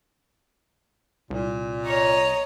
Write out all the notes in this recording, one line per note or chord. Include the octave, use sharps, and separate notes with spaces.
C2 A#2
C#5 D#5 A#5